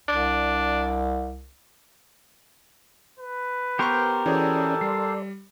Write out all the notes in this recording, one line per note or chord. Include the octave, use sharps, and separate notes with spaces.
C2 D4
B4
B3 G4 A#4 C5 C6 C#6
E3 C#4 F#4 G#4 A4 D5
G3 D5 C6